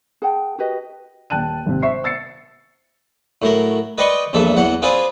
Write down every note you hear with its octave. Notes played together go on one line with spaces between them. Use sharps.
G#4 F#5 G5 A5
F#4 G4 B4 D#5
D#1 G5 A5 F#6 D#7
G#1 C3
C5 E5 C#6 C7
E6 A6 C7 C#7
A2 F#3 A#4
B4 D5 D#5 G5 C6 C#6
A#1 E2 G2 A4 E5
E2 F#3 F#5
C4 F4 G#4 B4 D5 F5